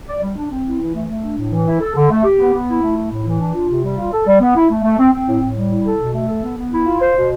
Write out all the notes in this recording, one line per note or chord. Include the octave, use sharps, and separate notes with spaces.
D5
G3
D4
C4
E4
E3
A3
A3
D4
A2
E3
E4
A4
D3
A3
G4
B3
B3
E4
A3
E4
A2
E3
D4
F4
C3
G3
F4
A4
G3
B3
E4
A3
A3
C4
C4
A2
A2
G3
E4
A4
B2
A3
A4
B3
B3
E4
F4
C5
B2